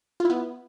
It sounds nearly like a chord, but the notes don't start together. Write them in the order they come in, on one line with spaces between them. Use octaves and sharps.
F4 E4 B3